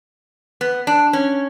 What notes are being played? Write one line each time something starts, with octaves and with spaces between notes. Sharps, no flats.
B3
D4
C#4